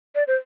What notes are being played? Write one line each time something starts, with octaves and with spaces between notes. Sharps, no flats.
D5
C5